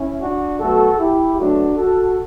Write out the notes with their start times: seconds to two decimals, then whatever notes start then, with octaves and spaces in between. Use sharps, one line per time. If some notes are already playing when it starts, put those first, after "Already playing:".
Already playing: C#4 E4
0.21 D4 F#4
0.60 B2 F#3 A3 F#4 A4
0.99 E4 G4
1.38 B2 F#3 A3 D4 F#4
1.77 F#4 A4